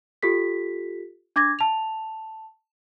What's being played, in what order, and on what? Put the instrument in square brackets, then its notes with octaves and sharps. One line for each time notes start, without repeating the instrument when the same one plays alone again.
[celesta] F4 G4 A4 B6
D4 D6 G#6 A#6
A5 F7